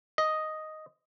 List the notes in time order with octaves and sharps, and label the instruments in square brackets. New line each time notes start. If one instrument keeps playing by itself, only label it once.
[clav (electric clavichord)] D#5